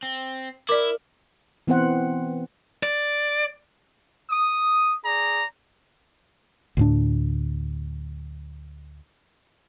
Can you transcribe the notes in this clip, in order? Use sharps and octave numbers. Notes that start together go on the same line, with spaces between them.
C4
E4 A#4 D5 D6
E3 B3 C4 C5 F#5
D5
D#6
G#4 D5 A#5
D2 A2 D4